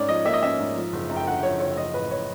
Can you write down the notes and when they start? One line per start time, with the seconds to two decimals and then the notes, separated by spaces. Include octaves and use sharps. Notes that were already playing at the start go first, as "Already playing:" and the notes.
Already playing: G#2 C#4 C#5 D5
0.08 F3 D#5
0.25 A#3 E5
0.33 D#5
0.42 C#4 E5
0.59 G#2
0.76 F3
0.93 F#1
1.10 F#2
1.17 G5
1.27 D3 F#5
1.43 F3 C#5
1.60 F#1 C#5
1.77 F3 D#5
1.94 A1 B4
2.11 C#5